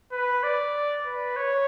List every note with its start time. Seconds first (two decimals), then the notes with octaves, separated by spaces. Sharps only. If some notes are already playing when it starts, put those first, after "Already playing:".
0.12 B4
0.43 D5
1.06 B4
1.36 C#5